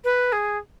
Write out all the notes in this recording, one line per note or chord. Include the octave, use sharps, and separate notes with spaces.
B4
G#4